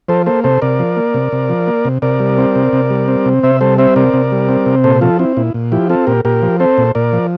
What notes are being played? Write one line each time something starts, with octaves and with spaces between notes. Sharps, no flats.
F3 A4 C5
A#3 A4 C5
C3 A4 C5
C3 A#4 D5
F3
A#3
C3
C3
F3
A#3
C3
C3 A#4 D5
G3
C4
C3
C3
G3
C4
C3
C3 C5 E5
G3 A4 C5
C4 C5 E5
C3 A#4 D5
C3
G3
C4
C3
A#2 A4 C5
F3 F4 A4
C4 E4
A#2 E4
A#2
F3 E4 G4
C4 F4 A4
A#2 G4 A#4
A#2 G4 A#4
F3
C4 A4 C5
A#2
A#2 A#4 D5
F3